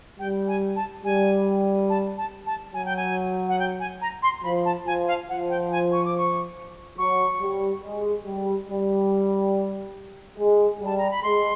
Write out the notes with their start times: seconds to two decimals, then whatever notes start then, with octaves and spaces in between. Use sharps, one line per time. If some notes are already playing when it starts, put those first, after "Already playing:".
0.19 G3 G5
0.48 G#5
0.76 A5
1.05 G3 G#5
1.90 A5
2.17 A5
2.46 A5
2.74 F#3 G#5
2.85 G5
2.96 G#5
3.49 F#5
3.59 G5
3.80 G#5
4.02 A#5
4.23 C6
4.44 F3 B5
4.65 A5
4.87 F3 G#5
5.07 F5
5.29 F3 F#5
5.50 G5
5.72 G#5
5.92 C#6
6.05 D6
6.17 C#6
6.98 F#3 C#6
7.41 G3
7.83 G#3
8.25 G3
8.68 G3
10.38 G#3
10.81 G3 A5
10.98 A#5
11.11 B5
11.23 G#3 C6